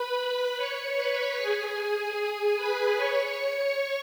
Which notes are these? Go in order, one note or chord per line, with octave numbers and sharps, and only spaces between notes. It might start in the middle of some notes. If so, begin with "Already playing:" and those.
Already playing: B4 B5
B4 B5
C#5 C#6
B4 B5
G#4 G#5
B4 B5
C#5 C#6